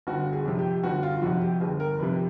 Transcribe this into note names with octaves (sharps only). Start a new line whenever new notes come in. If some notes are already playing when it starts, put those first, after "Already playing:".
G1 F#4
G#4
F2 C3
G4
G1 F#4
F4
F2 C3 F#4
G4
G1 G#4
A#4
F2 C3 B4